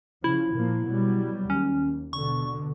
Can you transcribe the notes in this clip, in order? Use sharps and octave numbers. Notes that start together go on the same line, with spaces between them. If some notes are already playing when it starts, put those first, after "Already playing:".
C#3 F3 E4
A#2 F3 A#3
B2 F#3 G3
D#2 C#4
B2 D3 C#6